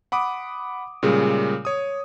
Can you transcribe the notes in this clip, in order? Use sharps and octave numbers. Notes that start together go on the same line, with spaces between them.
F#5 B5 D6 D#6
A#2 C#3 G3 G#3 G#4
C#5 D#6